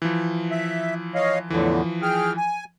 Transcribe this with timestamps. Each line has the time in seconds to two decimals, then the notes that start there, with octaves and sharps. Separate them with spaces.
0.02 E3 F3
0.51 E5
1.15 C#5 D#5 F5
1.50 E2 A2 D3 E3 F3
2.02 G#4 G5 F6
2.37 G#5